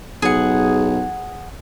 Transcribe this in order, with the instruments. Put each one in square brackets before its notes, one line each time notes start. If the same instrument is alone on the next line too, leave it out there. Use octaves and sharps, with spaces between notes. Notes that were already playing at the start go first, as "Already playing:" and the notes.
[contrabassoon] B1 [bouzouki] G#4 F#5